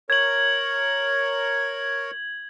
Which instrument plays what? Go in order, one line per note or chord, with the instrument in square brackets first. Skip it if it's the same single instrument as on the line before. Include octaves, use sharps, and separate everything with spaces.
[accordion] A#4 C#5 [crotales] G#6 F#7